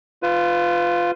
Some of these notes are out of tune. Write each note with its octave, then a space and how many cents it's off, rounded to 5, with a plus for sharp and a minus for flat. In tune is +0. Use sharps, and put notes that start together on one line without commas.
F4 +0 B4 +30